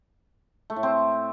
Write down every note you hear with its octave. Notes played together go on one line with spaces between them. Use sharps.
A3
A2
C4